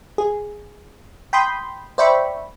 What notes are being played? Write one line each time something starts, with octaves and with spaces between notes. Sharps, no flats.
G#4
G5 B5 C6 D#6 G6
C5 D5 E5 G5 B5 C#6